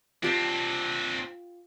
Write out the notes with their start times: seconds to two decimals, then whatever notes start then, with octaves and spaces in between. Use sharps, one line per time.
0.23 C4 D4 F4 G4